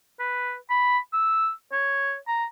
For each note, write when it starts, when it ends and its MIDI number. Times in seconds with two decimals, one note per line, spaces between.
0.20 0.55 71
0.70 0.98 83
1.13 1.51 88
1.72 2.17 73
2.27 2.45 82